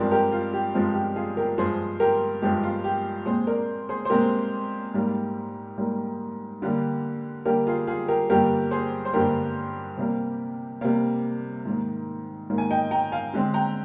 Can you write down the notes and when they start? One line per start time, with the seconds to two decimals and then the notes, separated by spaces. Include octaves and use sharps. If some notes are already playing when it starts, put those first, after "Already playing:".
Already playing: G2 F3 G#3 C4 A#4 D5
0.11 G4 A#4
0.32 F4
0.53 G4
0.74 G2 F3 G#3 C4 F4
0.95 G4
1.16 F4 G#4
1.37 G4 A#4
1.58 G2 F3 G#3 G#4 C5
2.00 G4 A#4
2.42 G2 F3 G#3 G4
2.63 F4
2.84 G4
3.26 A#2 G#3 C4 G#4 C5
3.47 A#4 D5
3.89 G#4 C5
4.05 C5
4.10 A#2 G#3 C4 G4 A#4
4.94 G#2 G3 A#3
5.78 G#2 G3 A#3
6.62 D3 G3 A#3
7.45 D3 G3 A#3 G4 A#4
7.67 F4 G#4
7.87 F4 G#4
8.08 G4 A#4
8.29 G2 D3 G3 A#3 G4 A#4
8.71 G#4 C5
9.05 C5
9.13 G2 D3 G3 A#3 G4 A#4
9.98 C3 G3 A#3
10.81 C3 G3 A#3
11.65 G#2 D#3 A#3
12.50 G#2 D#3 A#3
12.58 G#5
12.70 D#5 G5
12.91 G5 A#5
13.12 F5 G#5
13.34 D3 G#3 C4
13.54 G5 A#5